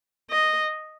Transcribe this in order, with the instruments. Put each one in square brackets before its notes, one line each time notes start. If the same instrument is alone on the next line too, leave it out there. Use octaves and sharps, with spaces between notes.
[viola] D#5